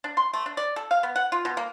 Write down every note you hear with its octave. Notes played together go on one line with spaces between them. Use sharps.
D4
C6
A3
D4
D5
A4
F5
B3
F#5
F4
B2
A#3